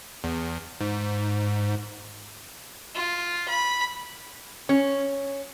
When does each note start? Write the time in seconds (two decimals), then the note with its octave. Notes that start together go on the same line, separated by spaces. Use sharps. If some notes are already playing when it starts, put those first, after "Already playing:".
0.24 E2
0.80 G#2
2.95 F4
3.48 B5
4.69 C#4